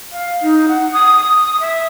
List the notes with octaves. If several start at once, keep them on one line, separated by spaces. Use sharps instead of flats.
F5
D#4
F#5
D#6
E5